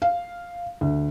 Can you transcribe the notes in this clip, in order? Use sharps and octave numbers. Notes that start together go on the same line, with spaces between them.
F5
D2